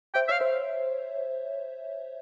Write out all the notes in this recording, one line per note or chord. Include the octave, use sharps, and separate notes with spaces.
C5 E5 G5
C#5 E5 F5
C5 E5